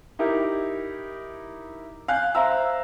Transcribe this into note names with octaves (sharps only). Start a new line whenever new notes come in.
D#4 E4 G4 A#4
F5 G#5 F#6 G6
C5 E5 F5 A#5 E6